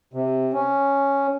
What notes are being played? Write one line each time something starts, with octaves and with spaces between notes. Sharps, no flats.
C3
C#4